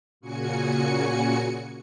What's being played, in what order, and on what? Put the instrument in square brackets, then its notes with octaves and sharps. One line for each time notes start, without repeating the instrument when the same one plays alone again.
[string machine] A#2 C#3 F#4 G#5 C#7